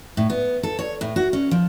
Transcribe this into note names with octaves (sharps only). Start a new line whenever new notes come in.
A2
B3
A4
C#5
A2
F#4
C#4
F3